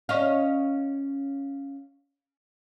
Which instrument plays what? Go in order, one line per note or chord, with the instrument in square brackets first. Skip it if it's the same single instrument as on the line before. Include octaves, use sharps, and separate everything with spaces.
[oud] C#4 D#5 F5